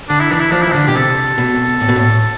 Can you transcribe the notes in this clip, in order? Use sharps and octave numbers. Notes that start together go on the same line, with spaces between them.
D3 D4
E4
E3 D4
E4
F3 D4
E4
E3
D3 D4
B2 G4
C3 A4
B2
A2
B2
A2